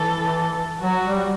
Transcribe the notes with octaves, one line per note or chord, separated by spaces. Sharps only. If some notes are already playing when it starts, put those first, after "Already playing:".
Already playing: E3 A4
F#3 F#4
G3